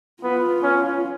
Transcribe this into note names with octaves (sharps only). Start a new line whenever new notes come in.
B3 F4
C#4